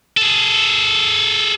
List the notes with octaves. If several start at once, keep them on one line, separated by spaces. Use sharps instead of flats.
G#4 A4